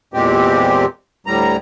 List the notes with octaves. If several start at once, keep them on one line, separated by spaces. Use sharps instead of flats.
E2 A#2 G#3 C4 G4
D2 A2 G3 A#5